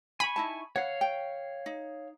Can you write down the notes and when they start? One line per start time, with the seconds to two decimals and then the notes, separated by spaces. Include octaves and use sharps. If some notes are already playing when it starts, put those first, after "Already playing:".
0.20 G#5 B5 C#6
0.36 D#4 E4 A5
0.76 C#5 F5 F#5
1.01 G5
1.66 D#4